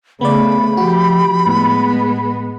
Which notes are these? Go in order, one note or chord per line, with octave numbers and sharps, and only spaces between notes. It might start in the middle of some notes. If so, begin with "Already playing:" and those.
C#3 A3 B3 D5 B5
F3 F#4 G4
A2 G#3 B3